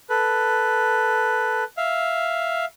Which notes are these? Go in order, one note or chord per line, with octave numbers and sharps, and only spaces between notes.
A4 B4
E5 F5